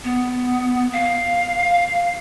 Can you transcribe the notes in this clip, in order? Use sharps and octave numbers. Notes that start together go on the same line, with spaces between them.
B3
F5